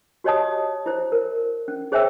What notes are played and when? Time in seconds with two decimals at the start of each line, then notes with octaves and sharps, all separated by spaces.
0.24 F#4 G4 C#5 D#5 A5 D#6
0.86 E4 C5
1.12 A#4
1.68 C#4
1.92 G#4 C5 C#5 E5 G5 E6